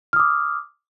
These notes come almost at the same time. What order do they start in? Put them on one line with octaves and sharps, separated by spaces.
F6 D#6 D6